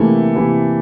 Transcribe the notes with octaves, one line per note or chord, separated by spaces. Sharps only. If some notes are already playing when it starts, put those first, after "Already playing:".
Already playing: C3 E3 A3 A#3 E4
C3 E3 A#3 E4